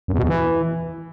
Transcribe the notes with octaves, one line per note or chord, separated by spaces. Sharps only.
F#2
E2
B2
E2
E3